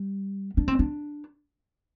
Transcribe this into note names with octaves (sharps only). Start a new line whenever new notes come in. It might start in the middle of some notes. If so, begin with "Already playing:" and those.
Already playing: G3
D4
C4
D4